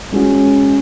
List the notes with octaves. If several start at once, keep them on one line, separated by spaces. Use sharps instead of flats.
G#3 C#4 F#4